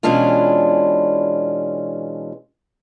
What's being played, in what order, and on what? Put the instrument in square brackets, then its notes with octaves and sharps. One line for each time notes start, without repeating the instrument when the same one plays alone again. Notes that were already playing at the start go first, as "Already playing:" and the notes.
[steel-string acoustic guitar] B2 E3 G#3 C#4 D4 F4